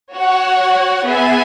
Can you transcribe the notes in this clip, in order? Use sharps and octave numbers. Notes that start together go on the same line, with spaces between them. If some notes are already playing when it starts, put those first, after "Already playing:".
F#4 C#5 F#5
B3 G#4 E5 G#5